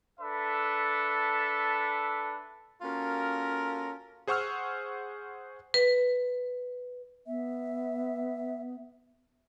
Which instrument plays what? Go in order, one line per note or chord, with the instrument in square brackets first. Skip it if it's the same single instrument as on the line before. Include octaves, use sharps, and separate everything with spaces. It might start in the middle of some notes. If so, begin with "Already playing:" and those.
[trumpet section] D4 A4 B4 E5
[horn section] A#3 C#4 F4 F#4 A4 A#4
[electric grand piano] G#4 C5 F#5 C#6 E6 F6
[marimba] B4
[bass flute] B3 [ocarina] E5